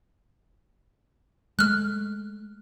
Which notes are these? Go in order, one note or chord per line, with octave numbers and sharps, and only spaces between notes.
G#3 A3 F6 F#6